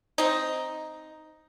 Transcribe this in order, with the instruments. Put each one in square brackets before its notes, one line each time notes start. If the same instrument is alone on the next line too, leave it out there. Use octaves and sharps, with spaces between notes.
[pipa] C4 D#4